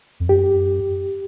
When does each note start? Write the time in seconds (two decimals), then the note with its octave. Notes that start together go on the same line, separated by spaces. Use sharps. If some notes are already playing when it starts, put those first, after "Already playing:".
0.20 F2
0.29 F#2 G4